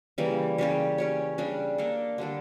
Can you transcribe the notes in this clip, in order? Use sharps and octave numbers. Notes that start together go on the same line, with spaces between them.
C#3 E3 G3 A#3
C#3 G3 C#4 G4
C#4 G4 C#5
C#3 G3 D4
A#3 D4 A4
D3 G3 D4 A4